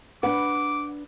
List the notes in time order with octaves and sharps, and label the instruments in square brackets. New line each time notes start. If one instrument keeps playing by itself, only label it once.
[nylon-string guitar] D4 B4 [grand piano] F#5 [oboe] D6